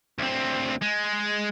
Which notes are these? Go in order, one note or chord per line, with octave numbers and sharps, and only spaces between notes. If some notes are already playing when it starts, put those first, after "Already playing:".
D2 C4
G#3